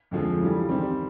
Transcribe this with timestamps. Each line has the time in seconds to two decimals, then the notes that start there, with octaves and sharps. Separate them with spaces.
0.11 F2 D3 F3 G#3
0.41 C#3 E3 G3
0.69 D#3 G3 C4